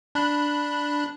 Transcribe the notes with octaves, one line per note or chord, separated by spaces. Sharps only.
D4 B5 F#6